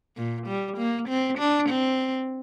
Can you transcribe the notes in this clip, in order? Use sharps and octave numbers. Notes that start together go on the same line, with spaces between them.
A#2
G3
A#3
C4
D4
C4